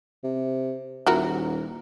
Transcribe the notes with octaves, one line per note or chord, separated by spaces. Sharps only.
C3
D#1 E4 F#4 A#4